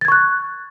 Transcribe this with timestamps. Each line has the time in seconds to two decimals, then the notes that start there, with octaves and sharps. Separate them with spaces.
0.01 A6
0.05 G#6
0.08 C#6
0.12 F#6